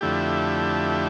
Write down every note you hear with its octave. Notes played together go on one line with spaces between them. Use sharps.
F2 D3 A3 E4 G4